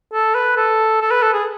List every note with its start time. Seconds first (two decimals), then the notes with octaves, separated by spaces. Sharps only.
0.13 A4
0.35 B4
0.57 A4
1.01 A4
1.11 B4
1.23 A4
1.33 G#4